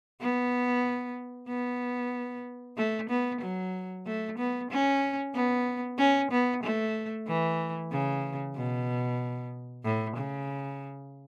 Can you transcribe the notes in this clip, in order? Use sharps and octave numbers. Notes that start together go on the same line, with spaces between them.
B3
B3
A3
B3
F#3
A3
B3
C#4
B3
C#4
B3
A3
E3
C#3
B2
A2
C#3